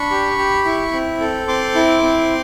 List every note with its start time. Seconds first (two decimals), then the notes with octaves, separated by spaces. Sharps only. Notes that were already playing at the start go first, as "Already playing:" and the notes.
Already playing: D4 B5 C#6
0.10 G4
0.38 G4
0.65 E4
0.93 C4
1.20 A4
1.48 C4 C6 D6
1.75 E4
2.03 C4